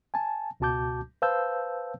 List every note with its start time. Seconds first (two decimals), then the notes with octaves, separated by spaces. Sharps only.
0.14 G#5 A5
0.60 C#2 B2 F#4 A5 D6 G6
1.22 B4 C5 F5 A5 E6 G6